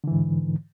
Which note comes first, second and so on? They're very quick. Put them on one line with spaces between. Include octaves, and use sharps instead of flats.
D3 E3 G#2